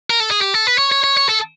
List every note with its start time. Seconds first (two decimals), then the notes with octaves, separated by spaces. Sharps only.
0.10 A#4
0.20 A4
0.31 G#4
0.41 G4
0.54 A4
0.67 B4
0.78 C#5
0.92 C#5
1.04 C#5
1.17 C#5
1.29 A4